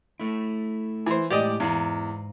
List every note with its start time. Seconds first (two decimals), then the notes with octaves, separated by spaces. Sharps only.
0.20 A3 E4
1.06 E3 C5
1.30 A2 G#3 E4 G4 D5 D#5
1.60 E2 G#2 F5 A#5